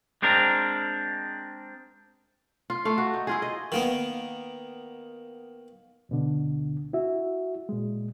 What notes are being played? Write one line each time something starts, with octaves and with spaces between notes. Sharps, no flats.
G#3 C4 D4 A#4
F4
A3 F5
F#4
D#4
E4 F4 G#4
D#5
D#3 A#3 B3
D2 B2 D3
E4 F#4 E5
A#2 G#3